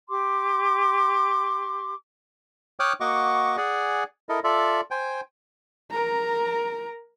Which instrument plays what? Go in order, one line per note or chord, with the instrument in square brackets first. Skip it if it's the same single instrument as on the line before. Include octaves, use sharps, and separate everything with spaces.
[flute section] G4 C6 D6
[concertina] C#5 G5 D6 D#6 F6 F#6
A#3 F#4 D#5 F#5 C#6 D6
G#4 D5 F#5 G#5
E4 A4 A#4 D#5
F4 A4 D5 E5
C5 G5 G#5
[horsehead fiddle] A#4 A#5